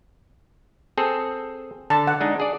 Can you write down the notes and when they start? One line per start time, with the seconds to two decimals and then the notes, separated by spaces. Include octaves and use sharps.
0.98 C4 G#4 A4
1.90 D3 A5
2.07 F#5
2.20 G#3 D4 D#4
2.40 G#4 D5